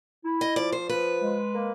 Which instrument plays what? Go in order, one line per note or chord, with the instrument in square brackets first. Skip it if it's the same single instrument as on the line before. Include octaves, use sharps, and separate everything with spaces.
[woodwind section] E4
[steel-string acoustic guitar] D#5
[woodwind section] F3 [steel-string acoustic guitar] D5
[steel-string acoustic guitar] C5
[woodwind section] F3 [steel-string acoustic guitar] B4
[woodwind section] G#3
A#3